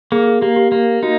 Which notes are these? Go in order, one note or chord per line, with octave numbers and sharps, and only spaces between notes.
A#3 G#4
G#4
A#3 G4
G4
A#3 G4
D#4 F#4